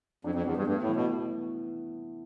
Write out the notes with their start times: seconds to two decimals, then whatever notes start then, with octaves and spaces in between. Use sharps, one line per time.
0.24 F2 D4
0.35 F2
0.46 E2 B3
0.57 G2
0.67 G2 A3
0.82 A2
0.89 E3
0.96 B2